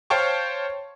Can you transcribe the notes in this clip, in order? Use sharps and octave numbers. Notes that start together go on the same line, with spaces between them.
C5 C#5 F5 G5 A5 C#6